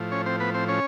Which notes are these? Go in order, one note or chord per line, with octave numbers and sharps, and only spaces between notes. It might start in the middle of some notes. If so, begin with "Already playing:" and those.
Already playing: A2 F3
C#4 C#5
C4 C5
B3 B4
C4 C5
C#4 C#5